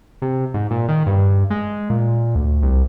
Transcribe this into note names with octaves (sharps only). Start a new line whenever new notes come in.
C3
G#2
A#2
D#3
G2
G#3
A#2
D2
C2